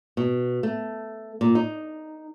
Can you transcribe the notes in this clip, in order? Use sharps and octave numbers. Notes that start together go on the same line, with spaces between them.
B2
A3
A#2
D#4